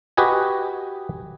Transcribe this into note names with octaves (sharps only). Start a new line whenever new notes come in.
F#4 G4 B4 D#5 G#5